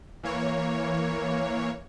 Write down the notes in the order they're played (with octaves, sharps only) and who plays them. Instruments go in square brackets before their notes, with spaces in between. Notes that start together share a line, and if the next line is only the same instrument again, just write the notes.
[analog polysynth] E3 A#3 C#5